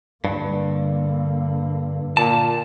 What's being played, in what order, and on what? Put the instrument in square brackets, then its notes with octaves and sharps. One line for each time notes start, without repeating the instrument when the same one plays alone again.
[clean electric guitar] G2 [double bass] D3 A#3
[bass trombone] A#2 [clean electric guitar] A5